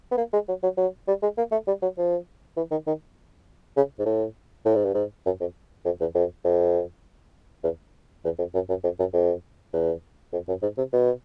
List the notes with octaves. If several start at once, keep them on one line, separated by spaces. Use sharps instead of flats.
B3
A#3
G#3
F#3
F#3
F#3
G3
G#3
A#3
A3
G3
F#3
F3
E3
D#3
D#3
C#3
G#2
A2
A2
G#2
G2
G#2
F#2
F2
F2
E2
F2
F2
E2
E2
F2
F#2
F#2
F2
F#2
F2
E2
F2
F#2
G#2
C3
B2